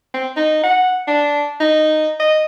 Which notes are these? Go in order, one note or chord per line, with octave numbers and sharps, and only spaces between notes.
C4
D#4
F#5
D4
D#4
D#5